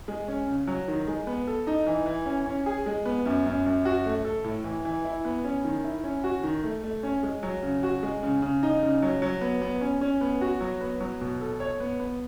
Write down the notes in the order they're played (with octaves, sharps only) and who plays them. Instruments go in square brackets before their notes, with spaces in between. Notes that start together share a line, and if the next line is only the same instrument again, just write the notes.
[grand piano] G#3
C#4
C#3
F#3
D#3
G#3
B3
A4
D#4
E3
E3
C#4
C#4
G#4
G#3
B3
F#2
F#2
F#2
F#4
A3
A4
A2
E3
E3
E4
B3
C#4
D#3
E4
C#4
F#4
D#3
A3
A3
C#4
G#3
F#3
C#3
F#4
G#3
C#3
C#3
D#4
C#3
F#3
F#3
B3
B3
C#4
C#4
B3
F#4
F#3
B3
F#3
B2
A4
C#5
B3
B3